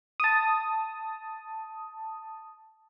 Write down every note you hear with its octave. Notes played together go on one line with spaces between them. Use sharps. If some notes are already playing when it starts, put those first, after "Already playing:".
A5 D#6